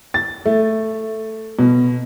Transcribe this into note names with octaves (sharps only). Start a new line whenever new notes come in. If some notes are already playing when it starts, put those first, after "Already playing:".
A6
A3
B2